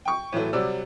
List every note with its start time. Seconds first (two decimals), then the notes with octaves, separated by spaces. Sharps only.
0.05 G5 C#6
0.33 A2 E3 F#3 A3
0.53 C3 F#3 G3 F#4 D5 E6